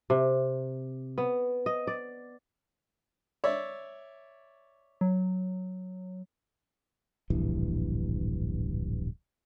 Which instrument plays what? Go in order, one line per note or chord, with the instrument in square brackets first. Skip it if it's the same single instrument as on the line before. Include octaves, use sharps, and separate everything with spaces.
[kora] C3
B3
D#5
D5
[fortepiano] C#5 D5 E5
[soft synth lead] F#3
[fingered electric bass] D1 A#1 G2 E3